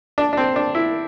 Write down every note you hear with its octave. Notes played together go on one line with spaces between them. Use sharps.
D4
D4
C4
D4
E4